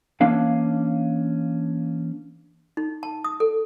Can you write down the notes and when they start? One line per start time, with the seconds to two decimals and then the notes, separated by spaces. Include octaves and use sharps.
0.21 E3 A#3 C#4 D4 F5
2.77 D#4
3.03 A5
3.24 D#6
3.40 A4